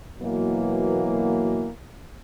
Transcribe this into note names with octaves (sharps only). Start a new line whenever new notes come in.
B2 E3 F#3 A#3